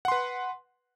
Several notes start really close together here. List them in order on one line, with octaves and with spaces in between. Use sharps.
F#5 C6 B4